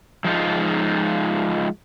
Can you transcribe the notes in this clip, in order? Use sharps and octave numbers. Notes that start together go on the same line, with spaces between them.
F3 G#3 D#4 F4